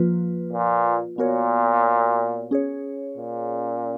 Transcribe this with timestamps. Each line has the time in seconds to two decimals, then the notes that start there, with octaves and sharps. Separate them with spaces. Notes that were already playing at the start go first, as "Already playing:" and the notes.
Already playing: F3 A#3 F4 B4
0.53 A#2
1.18 A#2 B3 F#4 A#4 C#5
2.51 C#4 G#4 C#5
3.18 A#2